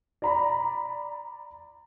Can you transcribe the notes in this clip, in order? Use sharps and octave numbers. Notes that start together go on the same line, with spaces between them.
D5 A#5 B5